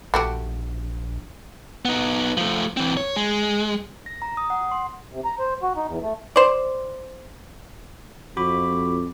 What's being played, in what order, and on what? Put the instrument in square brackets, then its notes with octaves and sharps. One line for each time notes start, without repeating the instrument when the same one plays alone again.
[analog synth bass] A#1 [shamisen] A3 F#4 G4
[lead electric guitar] B3 D#4
F3 A3
E3 C4
C#5
G#3
[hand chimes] A#6
A#5
D#6
F#5
C6
[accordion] C3
A#5
C5
F#4
D#4
E2
A3
[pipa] C5 D5
[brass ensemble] F2 [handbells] F#4 B5 D6